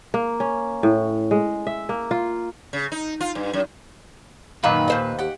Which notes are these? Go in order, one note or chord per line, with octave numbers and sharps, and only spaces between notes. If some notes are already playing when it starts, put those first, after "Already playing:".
A#3
C#4
A2
G#3
E5
A#3
F4
C#3
D#4
F4
G2
F#2
F#2 A#2 D#3 B4 F5 A#5 D6
D#2 C5 D#5
G4 F#5